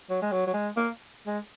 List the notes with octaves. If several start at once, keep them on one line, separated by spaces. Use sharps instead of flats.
F#3
G#3
F#3
F#3
G#3
A#3
G#3